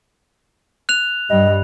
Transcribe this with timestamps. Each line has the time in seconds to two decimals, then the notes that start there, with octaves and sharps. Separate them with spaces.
0.89 F#6 F7
1.30 G2 G3 D#5